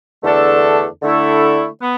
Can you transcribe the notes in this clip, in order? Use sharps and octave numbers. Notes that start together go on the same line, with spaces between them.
E2 D3 A3 D4 A4
D3 A3 E4 A4
B3